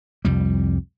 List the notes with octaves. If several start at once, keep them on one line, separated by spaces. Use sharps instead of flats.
C2 F2 G3